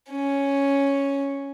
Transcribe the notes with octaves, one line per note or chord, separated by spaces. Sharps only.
C#4